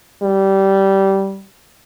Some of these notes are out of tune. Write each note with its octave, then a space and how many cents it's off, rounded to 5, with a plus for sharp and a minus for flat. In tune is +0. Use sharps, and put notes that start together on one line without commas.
G3 -15